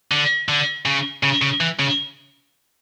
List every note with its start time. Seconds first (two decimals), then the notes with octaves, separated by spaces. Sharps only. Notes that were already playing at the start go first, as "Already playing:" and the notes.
0.11 D3
0.49 D3
0.86 C#3
1.23 C#3
1.42 C#3
1.61 E3
1.79 C#3